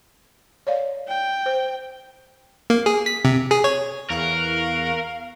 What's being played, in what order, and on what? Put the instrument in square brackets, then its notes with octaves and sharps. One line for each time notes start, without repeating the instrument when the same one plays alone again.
[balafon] C#5 D5 F5
[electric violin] G5
[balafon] C5
[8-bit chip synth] A#3
G#4
B6
C3
G#4
C#5
[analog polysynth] E2 C#6 F#6 [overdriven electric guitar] A#4 [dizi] F5